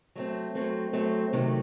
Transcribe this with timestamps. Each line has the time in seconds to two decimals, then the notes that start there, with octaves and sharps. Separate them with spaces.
0.15 F#3 A3 C4
0.55 F#3 A3 C4
0.93 F#3 A3 C4
1.33 C3 D#3 F#3 A3